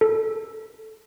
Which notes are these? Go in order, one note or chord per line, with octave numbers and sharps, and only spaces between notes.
A4